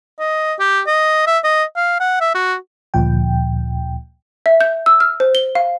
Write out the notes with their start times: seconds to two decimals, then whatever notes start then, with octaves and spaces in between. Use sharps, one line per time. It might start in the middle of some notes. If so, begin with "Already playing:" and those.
0.19 D#5
0.60 G4
0.87 D#5
1.27 E5
1.44 D#5
1.76 F5
2.00 F#5
2.20 E5
2.35 F#4
2.94 D2 A#2 F3 G5
4.46 E5
4.61 G6
4.86 E6
5.00 F6
5.20 C5
5.35 G7
5.55 F5